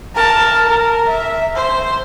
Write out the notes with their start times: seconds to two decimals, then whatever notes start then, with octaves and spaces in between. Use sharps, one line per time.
0.15 A#4 A5
0.66 A#4
1.08 E5
1.55 C5